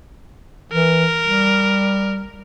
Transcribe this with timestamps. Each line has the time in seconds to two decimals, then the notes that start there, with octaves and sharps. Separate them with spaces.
0.72 E3 A#4
1.24 G3